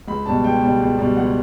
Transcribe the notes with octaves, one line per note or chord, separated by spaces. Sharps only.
C#2 B5
B2 G3 A5
C#2 G5
B2 G3
C#2
B2 G3
C#2 F#5